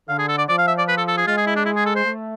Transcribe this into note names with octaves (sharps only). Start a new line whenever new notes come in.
D3 F5
G#4
A4
D5
F3 D5
F5
E5
D5
B4
A4
A4
G#4
G#3 F4
G#4
E4
D4
E4
G#4
A4
C5
A3